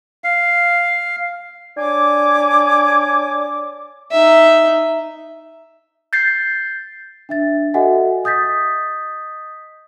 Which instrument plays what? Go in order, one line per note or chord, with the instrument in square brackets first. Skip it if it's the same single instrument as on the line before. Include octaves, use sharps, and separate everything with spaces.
[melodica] F5
[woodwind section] D4 C#5 D5 G#5 D6
[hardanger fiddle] D#4 E5
[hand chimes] G6 A6 C7
[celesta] D4 E5 A6
F#4 A4 D#5 E5 F#5 G#5
D#5 D#6 G6 A6 B6